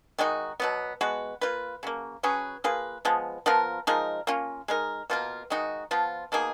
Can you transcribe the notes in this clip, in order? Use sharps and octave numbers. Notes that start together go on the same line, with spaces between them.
D#3 G#3 D#4 F#4
B2 F#3 B3
G#3 B3 F#4 B4
A#3 F4 B4
C#3 F#3 A#3
F#3 C#4 G#4 B4
A#3 F4 G#4 B4
F3 G#3 B3
F3 B3 F4 A#4
F3 G#3 D#4 A#4
A#3 C#4 F4
G#3 D#4 A#4
B2 A#3 F4 A#4
D#3 G#3 D#4 F#4
F3 B3 F4
B2 A#3 D#4 G#4